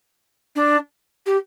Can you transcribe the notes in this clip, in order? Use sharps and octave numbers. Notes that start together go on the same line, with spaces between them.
D4
G4